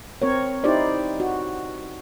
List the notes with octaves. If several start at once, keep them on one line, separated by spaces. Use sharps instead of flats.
C4 A#4 C#5
D#4 E4 G4 C5 D5
F#4